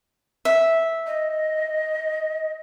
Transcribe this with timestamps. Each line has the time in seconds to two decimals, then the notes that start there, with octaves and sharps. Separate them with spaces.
0.45 E5
1.06 D#5